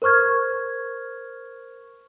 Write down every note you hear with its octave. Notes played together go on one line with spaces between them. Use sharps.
A#4 C5 C#6 F6 G#6